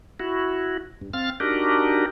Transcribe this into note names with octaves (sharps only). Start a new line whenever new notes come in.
E4 F#4
G2
C4 F5 F6 A6
D4 D#4 F#4 G4 A#4